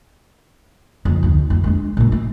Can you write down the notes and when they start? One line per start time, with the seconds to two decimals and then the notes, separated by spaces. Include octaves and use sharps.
1.05 F2 C#3
1.23 D2 D#3
1.50 F2
1.64 G#3 D4
1.97 G2 A#2
2.12 A3